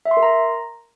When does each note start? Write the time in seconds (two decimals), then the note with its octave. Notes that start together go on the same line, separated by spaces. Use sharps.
0.05 E5
0.11 C6
0.17 A#4
0.23 A#5